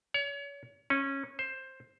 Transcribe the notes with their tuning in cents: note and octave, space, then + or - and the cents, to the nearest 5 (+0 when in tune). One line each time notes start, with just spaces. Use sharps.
C#5 +35
C#4 -15
C5 +10